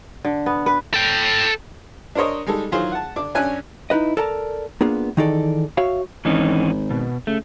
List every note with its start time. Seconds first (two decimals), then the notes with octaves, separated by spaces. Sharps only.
0.25 D3
0.46 B3
0.66 B4
0.94 A4 G5
2.15 D4 A#4 C5 C#5 D#5
2.46 G3 G#3 D#4 A4
2.72 D#3 E3 F#3 F4 G#4 C5
2.92 F#5 A5
3.16 D3 D4 D6
3.34 F#2 C#4 D4 G#5 F#6
3.90 D#4 E4 B4 D#5
4.17 A4 A#4 D5 A5 A#5
4.81 A#3 B3 D4 F4 G#4
5.17 D#3 E3 D#4 G#4 A4 D5
5.77 F#4 C#5 E5 F5
6.25 G#1 E3 C#4 D#4
6.90 B2
7.27 C#3 A3